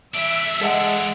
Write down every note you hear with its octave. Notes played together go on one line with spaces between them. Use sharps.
E3 D4 E5
G#3 A4 F#5 A5